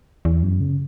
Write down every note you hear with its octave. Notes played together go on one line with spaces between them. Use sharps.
E2
F#2
C#3